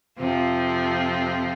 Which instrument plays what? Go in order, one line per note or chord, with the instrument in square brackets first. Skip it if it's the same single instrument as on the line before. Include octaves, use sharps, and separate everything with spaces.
[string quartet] F2 C3 F3 C4 F4